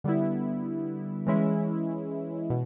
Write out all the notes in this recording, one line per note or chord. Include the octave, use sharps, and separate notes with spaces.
D3 G3 B3 E4
E3 G#3 C#4 E4
B2